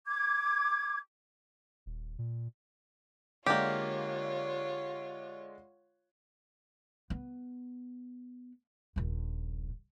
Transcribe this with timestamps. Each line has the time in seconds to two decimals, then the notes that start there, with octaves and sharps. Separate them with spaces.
0.07 D6 G#6
1.86 D#1
2.19 A#2
3.46 D3 G#3 A#3 F4 G4 C#5 D5
7.10 B3
8.96 D#1 A#1